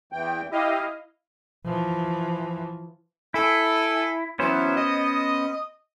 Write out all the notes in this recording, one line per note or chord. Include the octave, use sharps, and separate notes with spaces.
E2 E3 G5
E4 G4 D#5 F5
E3 F3
E4 A4 G#5
E3 F#3 B3 C#4 C5
D#5